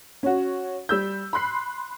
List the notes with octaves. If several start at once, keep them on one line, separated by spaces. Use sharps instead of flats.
C#4 F#4
G3 E6 G6
B5 C6 F#6 C7